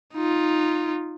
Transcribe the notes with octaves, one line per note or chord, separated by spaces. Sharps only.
D#4 F4